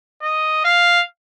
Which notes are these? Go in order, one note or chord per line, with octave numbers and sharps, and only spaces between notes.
D#5
F5